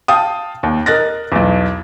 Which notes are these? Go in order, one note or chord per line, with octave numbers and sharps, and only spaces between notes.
F5 G5 A5 D#6
D#2
A#4 D#5 F#6 A6 A#6
B1 E2